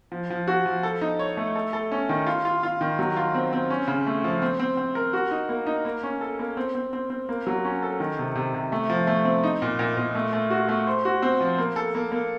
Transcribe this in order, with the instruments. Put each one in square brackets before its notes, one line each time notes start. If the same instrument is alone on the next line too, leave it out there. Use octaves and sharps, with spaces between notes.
[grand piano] F3
F3
F#4
F3
A4
D#4
C#5
A3
A4
A4
C#4
D#3
F4
F4
F4
D#3
F#3
F4
C4
C4
C#4
C#3
A3
F3
C4
C4
C4
A#4
F#4
D#4
A#3
D#4
A#3
C#4
A4
A#3
C4
C4
C4
C4
A#3
F#3
C#4
A4
D#3
C3
C3
C3
A3
F3
A3
C4
D#4
A#2
A#2
A#2
A3
A3
F#4
A3
C5
F#4
C4
F3
A#3
A4
A#3
A#3